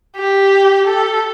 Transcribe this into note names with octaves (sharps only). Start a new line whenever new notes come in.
G4
A4